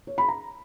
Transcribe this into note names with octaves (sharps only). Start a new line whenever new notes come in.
C#5
B5
A#5